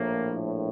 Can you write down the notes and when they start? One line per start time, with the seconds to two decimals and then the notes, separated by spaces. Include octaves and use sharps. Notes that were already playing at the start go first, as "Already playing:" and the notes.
Already playing: A#1 A2 F3 A#3